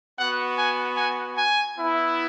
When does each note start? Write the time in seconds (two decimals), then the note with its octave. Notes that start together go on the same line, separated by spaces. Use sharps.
0.18 B3 F#4 F#5
0.58 G#5
0.97 G#5
1.37 G#5
1.76 B3 E4